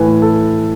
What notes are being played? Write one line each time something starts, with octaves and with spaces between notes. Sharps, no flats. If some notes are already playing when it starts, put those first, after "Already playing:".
Already playing: A2 E3 B4 G#5
A4